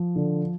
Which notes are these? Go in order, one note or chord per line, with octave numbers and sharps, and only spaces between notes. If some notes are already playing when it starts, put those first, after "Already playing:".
Already playing: F3
D3